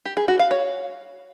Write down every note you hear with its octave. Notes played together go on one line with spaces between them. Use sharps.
G4
G#4
F#4
F5
C#5